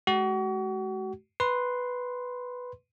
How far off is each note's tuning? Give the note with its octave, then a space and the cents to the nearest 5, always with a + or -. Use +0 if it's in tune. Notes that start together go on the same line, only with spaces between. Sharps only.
G#3 +45 F#4 +35
B4 +0 C6 +0